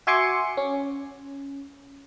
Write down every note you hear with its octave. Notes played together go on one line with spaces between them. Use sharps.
F#4 E5 G#5 C6 D6 C#7
C#4